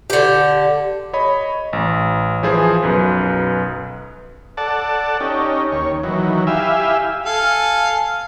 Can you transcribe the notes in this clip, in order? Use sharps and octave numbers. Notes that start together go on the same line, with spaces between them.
D3 G4
C#5 D#5 B5
A1
E3 F3 F4 G#4 C5
B1 F#2 B4
A4 D5 F#5 A5
C#4 D#4 G4
D#2 C#5
D#3 E3 F#3
E4 G4 E5 F5 G#5
A4 F5 G#5